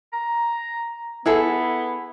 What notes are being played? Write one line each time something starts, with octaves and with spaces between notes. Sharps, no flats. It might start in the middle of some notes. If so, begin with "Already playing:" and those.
A#5
B3 E4 G#4 A4